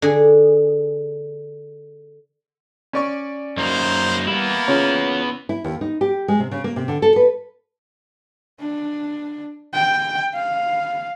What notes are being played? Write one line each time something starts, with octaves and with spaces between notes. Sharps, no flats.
D3 G#4
C#4 D5 C#6
F#2 A#3 D#4 C5
G3 A#3 B3 E4
C#3 C#4 F4 C#5
E4
D#2
D#4
G4
G#3
C3
C#3
A#3
C3
D3
A4
B4
D4
G5
F5